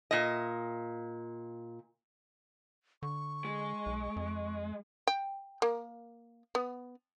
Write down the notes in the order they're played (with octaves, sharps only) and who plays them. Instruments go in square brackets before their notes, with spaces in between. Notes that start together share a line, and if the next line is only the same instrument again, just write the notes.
[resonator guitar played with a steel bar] A#2 D#5
[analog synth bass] D3 [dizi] C#6
[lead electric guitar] G#3
[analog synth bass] B1
F2
[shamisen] G5
A#3
B3